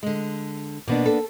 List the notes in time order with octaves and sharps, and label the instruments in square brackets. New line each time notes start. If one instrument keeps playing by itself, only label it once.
[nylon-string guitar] D3 G#3
[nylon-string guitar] B2 [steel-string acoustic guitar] A#3 B3 D4
[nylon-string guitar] A4